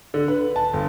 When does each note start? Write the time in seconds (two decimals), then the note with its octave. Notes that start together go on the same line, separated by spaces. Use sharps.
0.14 D3
0.28 B4
0.56 A5
0.73 G1